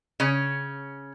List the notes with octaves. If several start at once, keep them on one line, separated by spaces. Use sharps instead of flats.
C#3 C#4